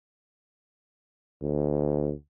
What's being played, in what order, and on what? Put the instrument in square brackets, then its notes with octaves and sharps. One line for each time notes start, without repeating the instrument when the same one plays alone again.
[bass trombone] D2